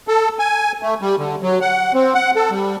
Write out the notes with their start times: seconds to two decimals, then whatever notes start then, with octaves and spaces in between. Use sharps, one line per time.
0.08 A4
0.39 G#5
0.82 A3
1.01 G3
1.18 D3
1.43 F#3
1.61 F#5
1.94 C4
2.14 F#5
2.36 A4
2.51 G3